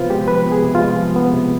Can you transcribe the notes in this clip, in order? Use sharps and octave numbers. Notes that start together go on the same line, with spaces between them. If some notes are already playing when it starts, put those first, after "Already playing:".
Already playing: C3 F3 B3 F4 B4 C5
G#3 G4
F3 B4
B3
G#4
C3
F4
G#3
F3
B3
C3